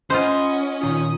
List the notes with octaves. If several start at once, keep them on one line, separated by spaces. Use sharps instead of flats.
C#4 F4 C5 D#5 F#5 B5 C6
A#2 D#3 F4 D#6